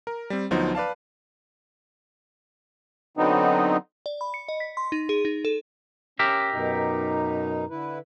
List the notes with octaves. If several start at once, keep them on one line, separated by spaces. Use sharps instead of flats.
A#4
G3 C4
D2 F3 F#3 B3 D#4 C5
B4 D5 F5 A5
D3 F#3 B3 C4 D#4
D5
B5
C#7
D#5
B6
C6
D#4
G#4
D#4
A4
C#4 G4 A#4 E5
F#2 B2 D#4
D3 E4 B4